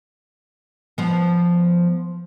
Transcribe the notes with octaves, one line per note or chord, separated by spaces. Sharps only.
F3 B3